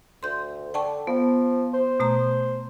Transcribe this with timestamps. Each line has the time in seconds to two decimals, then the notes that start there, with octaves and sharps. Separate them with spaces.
0.23 D2 C6 G6
0.74 D3 G5 A5 C#6
1.07 F3 B3
1.74 C5
2.00 B2 A3 A#5